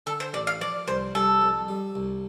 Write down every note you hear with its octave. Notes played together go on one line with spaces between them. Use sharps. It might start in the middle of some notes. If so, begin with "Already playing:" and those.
D3 A4
C5
A1 D5
F5
F3 D5
C2 C5
G3 A4
F2
G3
C2